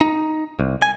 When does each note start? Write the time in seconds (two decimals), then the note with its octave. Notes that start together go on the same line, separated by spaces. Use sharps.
0.01 D#4
0.60 C2
0.82 G#5